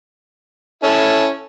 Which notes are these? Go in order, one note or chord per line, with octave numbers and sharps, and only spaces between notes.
C#4 E4 A4